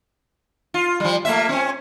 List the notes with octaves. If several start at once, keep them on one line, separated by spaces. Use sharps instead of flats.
F4
F3 G3
A3 A#3 E5
C4 C#4